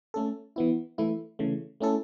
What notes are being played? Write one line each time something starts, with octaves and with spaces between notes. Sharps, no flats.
A3 C#4 A4
E3 B3 E4
E3 A3 E4
C#3 E3 A3
A3 C#4 E4 A4